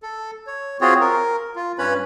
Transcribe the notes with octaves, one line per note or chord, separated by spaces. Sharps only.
A4
C#5
C4 F4 F#4 G#4 C#5
A#4
F4
G2 C#4 B4 C#5 B5